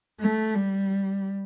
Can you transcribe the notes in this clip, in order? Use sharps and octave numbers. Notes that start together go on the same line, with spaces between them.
A3
G3